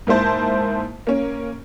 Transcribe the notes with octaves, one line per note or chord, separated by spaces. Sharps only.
G#2 A#3 E4 C5 A5
A#3 C#4